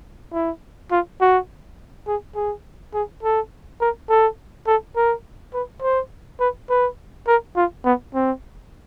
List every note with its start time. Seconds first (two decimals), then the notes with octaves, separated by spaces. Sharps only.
0.33 E4
0.92 F4
1.21 F#4
2.08 G#4
2.35 G#4
2.94 G#4
3.23 A4
3.81 A#4
4.10 A4
4.67 A4
4.96 A#4
5.54 B4
5.82 C5
6.40 B4
6.70 B4
7.28 A#4
7.56 F4
7.85 B3
8.14 C4